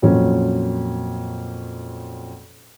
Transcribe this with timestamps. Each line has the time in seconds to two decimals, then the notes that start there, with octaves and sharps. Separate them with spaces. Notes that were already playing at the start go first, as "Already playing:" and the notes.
0.02 F2 A#2 F#3 C#4